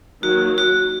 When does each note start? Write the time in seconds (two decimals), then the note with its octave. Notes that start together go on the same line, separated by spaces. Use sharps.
0.23 D#3 F#3 A#3 F#4
0.58 F#4